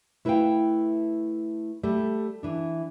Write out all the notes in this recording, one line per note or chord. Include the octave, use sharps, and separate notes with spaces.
A3 E4 B4 D#5 F5 G5
G3 A3
E3 D4